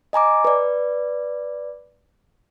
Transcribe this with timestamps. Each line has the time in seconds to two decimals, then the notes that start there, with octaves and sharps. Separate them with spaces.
0.13 D#5 G#5 A#5 D6
0.45 B4 D5